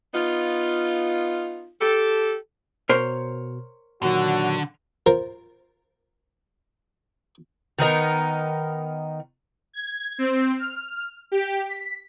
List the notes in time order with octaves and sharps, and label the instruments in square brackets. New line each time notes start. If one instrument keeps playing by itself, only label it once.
[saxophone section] B3 D#4 F4
G4 A4
[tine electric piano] B2 [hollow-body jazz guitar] A#4 C5 C#5
[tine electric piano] A#2 D#3 F#3 [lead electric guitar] D3 [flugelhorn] F#4
[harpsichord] F4 A#4 C5
[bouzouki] D#3 B3 D#4 A#4
[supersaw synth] G#6
C4
F6
G4
B6